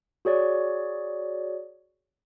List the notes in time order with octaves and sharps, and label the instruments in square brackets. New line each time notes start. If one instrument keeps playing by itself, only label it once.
[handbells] F#4 G#4 C#5 D5